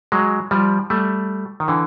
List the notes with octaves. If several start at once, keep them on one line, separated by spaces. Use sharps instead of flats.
F#3 G#3
F3 G3
G3 A3
D#3
D3 E3